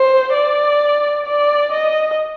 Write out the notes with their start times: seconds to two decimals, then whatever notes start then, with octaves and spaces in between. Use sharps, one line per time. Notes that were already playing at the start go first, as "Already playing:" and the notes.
Already playing: C5
0.33 D5
1.26 D5
1.72 D#5